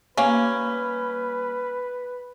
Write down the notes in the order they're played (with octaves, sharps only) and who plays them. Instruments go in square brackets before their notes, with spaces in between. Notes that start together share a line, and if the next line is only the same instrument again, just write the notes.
[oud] G3 A#3 F5 [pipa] C#4 [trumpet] B4